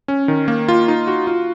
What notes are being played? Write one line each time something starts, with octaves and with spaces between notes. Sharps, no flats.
C#4
D#3
A#3
F4
D#4
F#4
F4